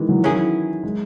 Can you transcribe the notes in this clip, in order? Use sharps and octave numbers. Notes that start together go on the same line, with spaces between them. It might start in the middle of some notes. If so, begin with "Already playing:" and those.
Already playing: D#3 E3 G#3
F#3
E3
D#3 F#3 C#4 E4 G#4
E3
G#3